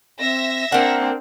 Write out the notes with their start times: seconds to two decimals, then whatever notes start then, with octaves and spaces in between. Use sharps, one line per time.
0.20 C4 E5 E6 A#6
0.72 A#3 C4 D4 A#4 F#5